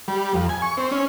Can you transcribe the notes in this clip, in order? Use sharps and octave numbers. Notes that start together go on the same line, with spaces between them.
G3
F2
G#5
C#6
C4
C#4